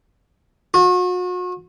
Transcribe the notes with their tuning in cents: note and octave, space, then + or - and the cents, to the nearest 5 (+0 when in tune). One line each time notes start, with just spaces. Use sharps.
F#4 -40